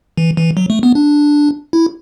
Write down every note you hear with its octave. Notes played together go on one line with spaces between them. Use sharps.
E3
E3
F#3
A3
B3
D4
E4